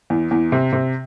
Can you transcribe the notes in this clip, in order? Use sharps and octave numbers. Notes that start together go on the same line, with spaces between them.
E2
E2
C3
C3